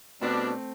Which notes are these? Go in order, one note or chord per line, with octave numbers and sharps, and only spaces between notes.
B2 G3 A3 C4 D4